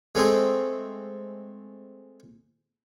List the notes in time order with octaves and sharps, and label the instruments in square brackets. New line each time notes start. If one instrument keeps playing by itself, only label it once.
[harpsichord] G#3 A3 C4 G#4